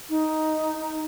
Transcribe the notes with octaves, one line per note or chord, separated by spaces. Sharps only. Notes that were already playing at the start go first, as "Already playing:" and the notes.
D#4